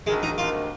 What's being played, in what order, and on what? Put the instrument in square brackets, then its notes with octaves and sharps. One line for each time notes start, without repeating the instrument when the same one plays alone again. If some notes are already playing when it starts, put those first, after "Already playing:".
[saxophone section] D2 C3 D#3 [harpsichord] G#3
[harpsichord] D#4
[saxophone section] D2 C3 D#3 [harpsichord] F4